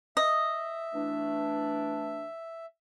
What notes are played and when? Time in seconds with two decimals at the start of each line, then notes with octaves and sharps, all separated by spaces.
0.17 D#5 E5
0.94 E3 A3 D4